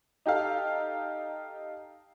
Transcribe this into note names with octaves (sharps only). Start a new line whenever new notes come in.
D#4 G4 A4 F5